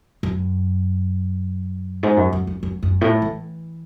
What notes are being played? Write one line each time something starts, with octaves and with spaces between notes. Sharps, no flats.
F#2
G#2
F#2
F#2
F#2
F#2
F#2
A2
E3